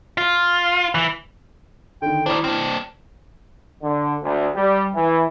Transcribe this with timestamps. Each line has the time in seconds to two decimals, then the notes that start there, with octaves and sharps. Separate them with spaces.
0.18 F4
0.95 E3
2.02 D3 D#3 G5
2.26 D#3 D4 E4 C5 D5 D6
2.44 C4 D4 F6
3.83 D3
4.23 D2
4.55 G3
4.95 E3